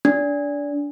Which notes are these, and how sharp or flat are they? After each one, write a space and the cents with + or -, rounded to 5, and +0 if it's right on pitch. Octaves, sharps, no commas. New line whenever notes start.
D4 -25